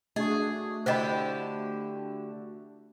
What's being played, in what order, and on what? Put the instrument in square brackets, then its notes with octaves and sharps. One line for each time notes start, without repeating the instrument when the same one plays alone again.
[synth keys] A3 D4 F#4 [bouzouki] G#4 [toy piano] D#5
[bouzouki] D3 E4 G4 [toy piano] C5 D#5 B5